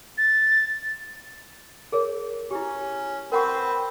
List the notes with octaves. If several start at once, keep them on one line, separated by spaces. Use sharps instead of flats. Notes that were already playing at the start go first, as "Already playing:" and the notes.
A6
G#4 A#4 C#5
C#4 E4 G4
C4 A#4 B4 F#5 C#6